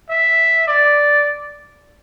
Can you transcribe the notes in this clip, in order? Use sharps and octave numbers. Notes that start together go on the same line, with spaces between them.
E5
D5